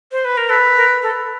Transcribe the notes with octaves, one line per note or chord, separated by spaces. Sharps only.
C5
B4
A#4
A4 B4
A#4
A4